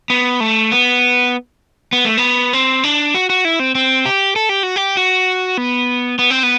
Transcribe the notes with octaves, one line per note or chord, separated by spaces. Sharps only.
B3
A3
B3
B3
A3
B3
C4
D4
F#4
F#4
E4
C4
C4
G4
A4
G4
F#4
G4
F#4
B3
B3
C4
B3